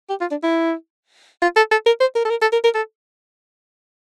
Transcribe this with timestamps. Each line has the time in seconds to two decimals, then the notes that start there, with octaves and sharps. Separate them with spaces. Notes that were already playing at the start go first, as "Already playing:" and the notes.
0.10 G4
0.21 F4
0.31 D4
0.43 E4
1.42 F4
1.56 A4
1.71 A4
1.86 A#4
2.00 C5
2.15 A#4
2.25 A4
2.30 A#4
2.42 A4
2.52 A#4
2.64 A#4
2.75 A4